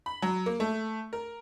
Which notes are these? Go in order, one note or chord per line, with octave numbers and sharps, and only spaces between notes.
B5
F#3
A#3
A3
A#4